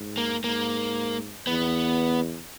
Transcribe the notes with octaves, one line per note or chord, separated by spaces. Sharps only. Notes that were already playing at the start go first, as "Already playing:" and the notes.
Already playing: G#2
A#3
G#2 A#3
E2 B3